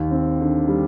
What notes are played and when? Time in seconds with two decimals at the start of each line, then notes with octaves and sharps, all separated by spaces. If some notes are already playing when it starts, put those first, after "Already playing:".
Already playing: D#2
0.11 C4
0.40 D3
0.67 G3